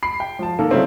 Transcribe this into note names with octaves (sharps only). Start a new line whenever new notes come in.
B5 C7
G5
F3 A5
D#3 A#3 A4
C#3 F#3 G3 A3 C4 E4